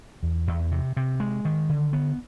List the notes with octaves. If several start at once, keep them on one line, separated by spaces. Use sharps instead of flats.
E2
E2
C3
C3
G#3
D#3
D3
B3